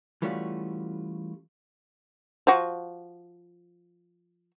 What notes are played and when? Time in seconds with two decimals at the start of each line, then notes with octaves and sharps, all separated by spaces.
0.22 E3 G3 A3 C#4 F4 F#4
2.47 F3 F#4